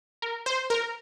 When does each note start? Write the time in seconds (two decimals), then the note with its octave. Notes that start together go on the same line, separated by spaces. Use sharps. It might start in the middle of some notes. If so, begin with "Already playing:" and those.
0.22 A#4
0.46 C5
0.70 A#4